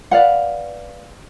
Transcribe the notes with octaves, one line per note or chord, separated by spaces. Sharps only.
B4 D5 F5 F#5